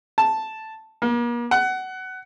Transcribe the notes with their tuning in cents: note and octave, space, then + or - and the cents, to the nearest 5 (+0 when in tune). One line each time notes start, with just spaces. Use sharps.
A5 +0
A#3 +40
F#5 +20